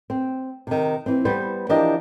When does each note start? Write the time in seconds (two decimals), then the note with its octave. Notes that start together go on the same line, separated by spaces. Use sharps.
0.10 C4
0.67 C3 D#3
1.06 E3 C4
1.25 G3 B3 C5
1.69 E3 F3 D4 G4 A#4 D#5